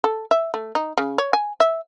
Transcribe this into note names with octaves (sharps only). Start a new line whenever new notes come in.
A4
E5
A3
D#4
C#3
C#5
G#5
E5